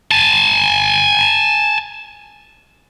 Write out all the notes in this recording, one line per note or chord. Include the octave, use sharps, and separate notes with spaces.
G#5 A5